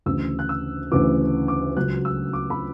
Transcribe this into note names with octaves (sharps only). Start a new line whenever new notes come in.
D2 C#3 E3 E6
F#6
E6
D2 C#3 E3 D6
D6
C#2 C#3 F#3 F#6
E6
D6
B5